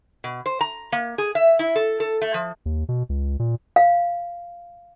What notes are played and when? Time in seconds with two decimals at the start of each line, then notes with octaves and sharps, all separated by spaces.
0.24 B2
0.46 C5
0.61 A#5
0.92 A#3
1.18 G#4
1.35 E5
1.59 E4
1.76 A4
2.00 A4
2.22 A3
2.34 F3
2.66 D#2
2.89 B2
3.09 C#2
3.39 A#2
3.76 F5